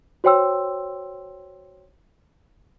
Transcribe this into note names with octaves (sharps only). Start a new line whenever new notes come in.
F#4 C5 C#5 G5 C6 E6